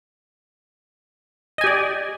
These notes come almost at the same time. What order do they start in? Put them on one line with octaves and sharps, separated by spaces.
D#5 G#5 G4 D5